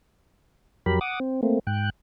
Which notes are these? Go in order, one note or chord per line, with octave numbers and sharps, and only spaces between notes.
F2 F#3 G4 A#4 B5
F#5 D6 D#6
C4
A3 A#3 C4
G#2 G5 F#6